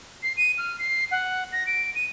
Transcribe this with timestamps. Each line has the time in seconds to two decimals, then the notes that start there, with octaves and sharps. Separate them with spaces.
0.23 C7
0.37 D#7
0.58 F6
0.79 C7
1.11 F#5
1.52 A#6
1.67 D7
1.95 D#7